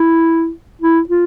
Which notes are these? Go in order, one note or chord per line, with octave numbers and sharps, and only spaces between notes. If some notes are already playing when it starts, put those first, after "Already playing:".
Already playing: E4
E4
F4